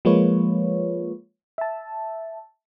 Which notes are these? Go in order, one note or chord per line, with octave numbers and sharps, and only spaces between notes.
F3 G#3 A#3 F4 B4 C#5
E5 A5